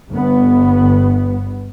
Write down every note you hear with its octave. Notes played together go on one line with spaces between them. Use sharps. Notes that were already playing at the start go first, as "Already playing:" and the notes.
G1 B3